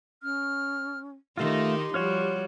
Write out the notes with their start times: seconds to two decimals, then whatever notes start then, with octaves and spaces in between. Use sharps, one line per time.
0.23 C#4 F6
1.37 D#3 A3 D#4 F4 G4 C6
1.94 F3 G3 F#4 C#5 F6